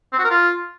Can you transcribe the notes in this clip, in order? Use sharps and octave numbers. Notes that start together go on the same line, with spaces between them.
C4
F#4
A#4
F4